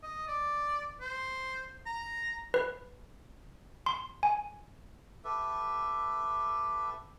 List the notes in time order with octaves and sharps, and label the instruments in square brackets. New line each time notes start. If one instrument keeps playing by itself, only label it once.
[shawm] D#5
D5
C5
A#5
[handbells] B4
C6
G#5
[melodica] G4 A4 B4 E5